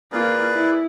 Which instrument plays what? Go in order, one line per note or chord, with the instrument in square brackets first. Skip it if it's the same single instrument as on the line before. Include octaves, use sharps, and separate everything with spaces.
[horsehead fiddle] A#3 F4 [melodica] G#4 B4 D5
[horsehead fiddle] E4